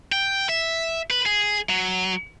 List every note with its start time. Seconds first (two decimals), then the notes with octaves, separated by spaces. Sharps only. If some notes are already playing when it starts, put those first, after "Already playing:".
0.12 G5
0.49 E5
1.10 B4
1.26 G#4
1.69 F#3